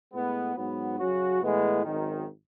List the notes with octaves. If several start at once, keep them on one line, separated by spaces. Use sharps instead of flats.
A2 G#3 B3
G#2 F#3 B3
C#3 F#3 C#4 F#4
A2 E3 G#3 B3
G#1 F#2 D#3